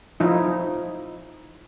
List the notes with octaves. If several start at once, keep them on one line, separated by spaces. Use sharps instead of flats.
F3 D#4 E4